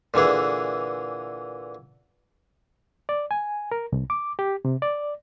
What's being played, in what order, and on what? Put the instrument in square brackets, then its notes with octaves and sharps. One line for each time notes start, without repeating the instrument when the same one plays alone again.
[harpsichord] A#2 D3 E3 G#4
[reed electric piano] D5
G#5
A#4
C2
D6
G4
C3
D5